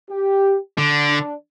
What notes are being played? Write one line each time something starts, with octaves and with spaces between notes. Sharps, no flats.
G4
D3
D4